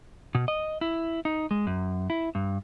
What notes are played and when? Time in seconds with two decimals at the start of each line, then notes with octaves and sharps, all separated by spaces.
0.35 B2
0.48 D#5
0.81 E4
1.25 D#4
1.51 G#3
1.67 F#2
2.10 E4
2.35 G2